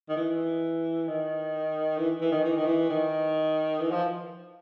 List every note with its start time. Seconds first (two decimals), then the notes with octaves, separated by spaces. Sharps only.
0.09 D#3
0.16 E3
1.07 D#3
1.98 E3
2.21 E3
2.31 D#3
2.44 E3
2.56 D#3
2.66 E3
2.89 D#3
3.80 E3
3.91 F3